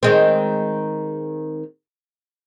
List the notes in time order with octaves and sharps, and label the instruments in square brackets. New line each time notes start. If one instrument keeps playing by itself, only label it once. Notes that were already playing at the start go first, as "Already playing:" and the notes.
[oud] D#3 G#3 C4